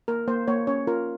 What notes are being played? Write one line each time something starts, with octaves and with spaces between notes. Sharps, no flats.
A#3 A#4
A#3 C5
A#3 C#5
C#4 C#5
F4 A#4